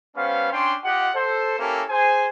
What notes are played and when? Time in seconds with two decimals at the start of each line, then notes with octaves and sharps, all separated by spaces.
0.16 G3 B3 C#4 C5 F5
0.52 C#4 D4 G5 C6
0.84 F4 G4 D#5 F#5
1.14 A4 C5
1.59 A#3 C#4 E4 G4 A4 A#4
1.89 G#4 C5 G#5